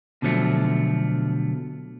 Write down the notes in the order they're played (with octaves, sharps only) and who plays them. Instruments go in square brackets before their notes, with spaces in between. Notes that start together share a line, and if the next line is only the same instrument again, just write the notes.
[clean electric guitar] B2 D3 F3 F#3 A3